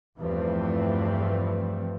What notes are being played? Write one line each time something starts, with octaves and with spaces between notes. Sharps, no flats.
E2 G2 E3 F3 A3 C4